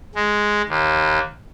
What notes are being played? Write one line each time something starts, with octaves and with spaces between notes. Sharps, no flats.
G#3
D#2